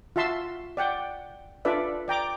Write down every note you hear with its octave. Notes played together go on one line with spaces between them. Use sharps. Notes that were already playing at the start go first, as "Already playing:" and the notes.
F4 F#4 E5 A5 C6 E6
D5 F#5 G5
D4 F4 A4 B4 D5 E5
D5 G5 A#5 D6